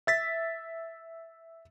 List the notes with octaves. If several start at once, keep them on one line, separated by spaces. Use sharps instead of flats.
E5 A6 B6